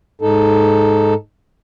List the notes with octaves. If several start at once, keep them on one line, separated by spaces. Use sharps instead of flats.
G#2 D#4 A4